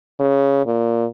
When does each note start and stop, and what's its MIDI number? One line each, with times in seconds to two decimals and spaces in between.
0.19 0.63 49
0.66 1.05 46